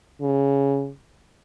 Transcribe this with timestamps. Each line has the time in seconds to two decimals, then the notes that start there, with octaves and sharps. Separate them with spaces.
0.22 C#3